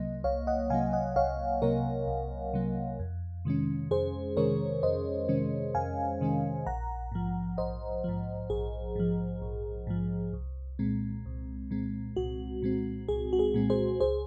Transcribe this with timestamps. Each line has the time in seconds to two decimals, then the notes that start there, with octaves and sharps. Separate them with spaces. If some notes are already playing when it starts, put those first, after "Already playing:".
Already playing: C2 C3 F#3 A#3 D#5
0.24 C2 C#5 F5
0.47 D#5 F#5
0.70 C3 F#3 A#3 F5 G#5
0.93 D#5 F#5
1.16 C2 C#5 F5
1.62 C3 F#3 A#3 A#4 C#5
2.07 C2
2.54 C3 F#3 A#3
2.99 F2
3.45 C3 D#3 G#3 C#4
3.91 F2 G#4 C5
4.37 C3 D#3 G#3 C#4 A#4 C#5
4.83 F2 C5 D#5
5.28 C3 D#3 G#3 C#4
5.75 F2 F5 G#5
6.21 C3 D#3 G#3 C#4
6.66 A#1 F#5 A#5
7.12 G#2 F3
7.58 A#1 C5 D#5
8.04 G#2 F3
8.50 A#1 G#4
8.96 G#2 F3
9.42 A#1
9.87 G#2 F3
10.33 C2
10.79 A#2 G#3 C4
11.26 C2
11.71 A#2 G#3 C4
12.16 C2 F#4
12.62 A#2 G#3 C4
13.09 C2 G#4
13.33 F#4
13.39 G#4
13.54 A#2 G#3 C4
13.70 G#4 C5
14.00 C#2 G#4 C5